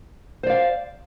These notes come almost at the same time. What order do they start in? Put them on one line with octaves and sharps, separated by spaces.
C5 D5 F5